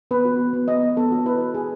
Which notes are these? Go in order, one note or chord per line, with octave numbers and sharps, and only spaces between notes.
B3 B4
F#4
B3
B3
B3 D#5
B3
B3 A4
F#4
E4 B4
E4
E4 G#4